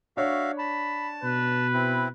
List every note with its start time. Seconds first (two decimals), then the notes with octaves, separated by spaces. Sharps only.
0.17 D4 F#4 C#5 E5 F5
0.58 A5 B5
1.23 B2 B4
1.73 C4 E4